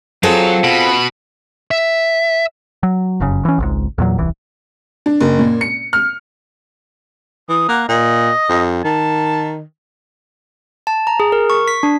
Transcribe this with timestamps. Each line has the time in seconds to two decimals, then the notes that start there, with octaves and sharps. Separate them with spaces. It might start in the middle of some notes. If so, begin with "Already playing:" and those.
0.23 F#3 C4 F4 G#4 A4
0.64 B2 B5
1.71 E5
2.83 F#3
3.20 F1 F#2 C#3
3.45 E3 C#4
3.58 G#1 C#2 G#2
3.98 E2 A#2 F#3
4.18 D#1 C2 E3
5.06 D4
5.21 F#1
5.39 A#2
5.61 C#7
5.93 F6
7.49 E3 D#6
7.69 A#3 F#5
7.89 A#2 D#5
8.49 F2
8.84 D#3 A5
10.87 A5
11.07 A#5
11.20 G#4
11.32 A#4
11.50 C#6
11.68 B6
11.83 D4